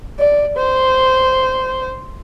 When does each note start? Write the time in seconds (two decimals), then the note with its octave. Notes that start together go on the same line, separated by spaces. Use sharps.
0.19 D5
0.57 C5